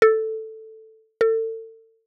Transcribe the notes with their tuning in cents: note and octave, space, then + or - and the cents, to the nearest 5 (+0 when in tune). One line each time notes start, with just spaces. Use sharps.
A4 +5
A4 +35